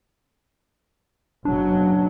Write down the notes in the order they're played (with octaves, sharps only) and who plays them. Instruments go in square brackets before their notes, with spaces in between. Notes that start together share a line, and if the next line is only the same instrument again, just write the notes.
[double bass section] F#1 B2 F#3 [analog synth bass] D4